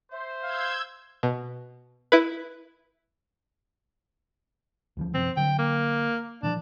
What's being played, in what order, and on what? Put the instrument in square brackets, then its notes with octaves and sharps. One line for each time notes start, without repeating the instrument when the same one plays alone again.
[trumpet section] C5 [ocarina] E5
[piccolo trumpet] F5 [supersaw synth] E6 G6 G#6
[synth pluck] B2
E4 B4
[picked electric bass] D2 E3 F3
[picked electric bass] F#2 C3 F3 [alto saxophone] C4
[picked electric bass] D3 F#3 [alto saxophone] G5
[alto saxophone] A#3
[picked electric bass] A#2 E3 F3 [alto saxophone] D4